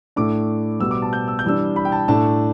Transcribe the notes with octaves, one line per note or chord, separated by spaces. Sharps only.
A2 A3 D4 D6
B2 G3 B3 E6
D6
A5
G6
E6
G6
E3 G3 D4 E6
B5
G5
A5
A2 A3 D4 A5